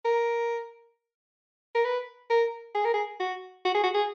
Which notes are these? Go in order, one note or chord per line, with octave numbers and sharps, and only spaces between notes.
A#4
A#4
B4
A#4
G#4
A#4
G#4
F#4
F#4
G#4
F#4
G#4